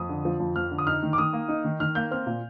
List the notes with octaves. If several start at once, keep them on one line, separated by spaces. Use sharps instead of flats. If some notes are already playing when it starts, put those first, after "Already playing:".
Already playing: F2 D#6
D3
F3
F2
F2 F6
D3
D#6
D#4 F6
D#3
D6
D#3 D#6
A#3
D#4
D#3
D#3 F6
A#3 G6
C4 F6
A#2